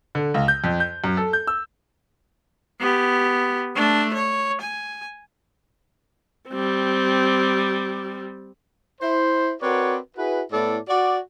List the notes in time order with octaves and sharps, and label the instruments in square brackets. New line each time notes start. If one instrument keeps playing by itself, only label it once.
[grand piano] D3
C#2
G6
F2
G6
F#2
A4
G6
E6
[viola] B3 G4
A3 D4
C#5
G#5
G3 C4
[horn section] E4 C5
C4 F#4 A#4 B4 C#5 D5
E4 F#4 G#4 B4
A2 B3 E4 A4 D5
F#4 D5